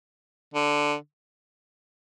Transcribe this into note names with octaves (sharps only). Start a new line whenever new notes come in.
D3